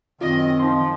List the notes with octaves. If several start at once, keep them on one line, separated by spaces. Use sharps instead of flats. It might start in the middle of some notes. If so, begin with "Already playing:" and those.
F#2 D#3 C4 F4 D#5
F3 D#4 C6